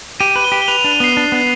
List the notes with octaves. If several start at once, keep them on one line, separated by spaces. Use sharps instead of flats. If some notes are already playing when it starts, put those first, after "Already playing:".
G4 D#7
B4
G7
G4
G7
B4 F7
F7
D4
D#7
B3 C7
D4
B3